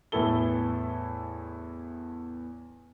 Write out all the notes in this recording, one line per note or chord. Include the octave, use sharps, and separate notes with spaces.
E2 A2 E3 E4 A4 G7